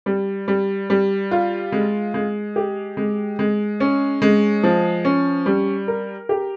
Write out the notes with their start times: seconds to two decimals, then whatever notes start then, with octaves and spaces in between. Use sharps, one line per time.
0.06 G3
0.48 G3
0.90 G3
1.31 F4
1.72 G#3
2.14 G#3
2.56 G4
2.97 G#3
3.39 G#3
3.80 C#4
4.22 G#3
4.63 F3
5.05 C#4
5.46 G3
5.88 A#4
6.29 G4